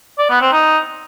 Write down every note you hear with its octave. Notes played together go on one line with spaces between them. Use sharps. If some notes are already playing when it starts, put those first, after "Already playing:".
D5
B3
C4
D#4